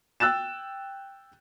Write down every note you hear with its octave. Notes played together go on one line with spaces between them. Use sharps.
G5 E6 F#6 A6 E7